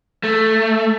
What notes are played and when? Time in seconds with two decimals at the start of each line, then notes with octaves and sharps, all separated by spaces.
0.23 A3